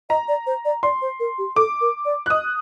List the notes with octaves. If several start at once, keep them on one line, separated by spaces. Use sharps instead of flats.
D#5 A#5
D5
C5
D5
D5 C6
C5
A#4
G4
A4 D6
A#4
D5
F#6
D#5 D#6